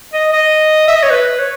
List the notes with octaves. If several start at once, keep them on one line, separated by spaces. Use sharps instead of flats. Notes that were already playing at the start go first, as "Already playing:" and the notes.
D#5
D#5
E5
D#5
C#5
B4
C#5